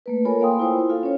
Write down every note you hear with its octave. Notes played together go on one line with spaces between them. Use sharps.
A3 A#3 B4
F4 A4 A#4 C#5 G#5 B5
A#3 F5 G5 G#5 C6 D#6
E4 F4 C5
F4 A4 F5
C#4 C#5